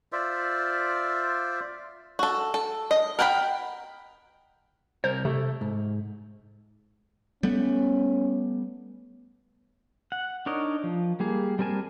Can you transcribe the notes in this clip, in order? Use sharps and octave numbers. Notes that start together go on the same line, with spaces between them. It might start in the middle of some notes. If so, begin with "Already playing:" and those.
F4 C5 D5 E5
F#4 A4
A4
D#5
A#4 F#5 G5 A5 B5
C2 A#4 C5
C3 A3
G#2
G3 A3 B3 C#4
F#5
D4 D#4 A#4 C#5 D#5
F3
G3 A#3 G#4
G3 C4 A#4 G#5 A5